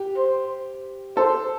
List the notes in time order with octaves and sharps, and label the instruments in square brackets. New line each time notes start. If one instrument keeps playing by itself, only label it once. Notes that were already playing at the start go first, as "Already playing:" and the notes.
Already playing: [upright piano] G4
[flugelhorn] C5
[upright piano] A4 [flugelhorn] C5